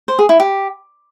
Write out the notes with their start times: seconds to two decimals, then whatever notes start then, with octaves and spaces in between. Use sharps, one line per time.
0.08 C5
0.19 G#4
0.29 E4
0.40 G4